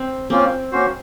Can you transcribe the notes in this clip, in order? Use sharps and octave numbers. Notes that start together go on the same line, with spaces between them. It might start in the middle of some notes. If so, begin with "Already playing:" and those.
Already playing: C4
A#3 C4 C#4 F4
A#3 C#4 F#4 C5